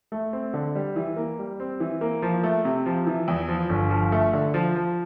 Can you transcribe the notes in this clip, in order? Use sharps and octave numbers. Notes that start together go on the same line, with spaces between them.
A3
C4
D3
G3
E3
A#3
G3
C4
E3
A#3
F3
A3
C3
F3
E3
E2
F3
G1
F3
A3
D3
F3
F3